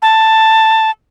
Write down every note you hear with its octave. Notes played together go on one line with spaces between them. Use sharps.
A5